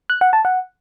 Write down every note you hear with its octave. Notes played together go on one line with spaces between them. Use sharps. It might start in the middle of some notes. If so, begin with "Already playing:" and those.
F#6
F#5
A5
F#5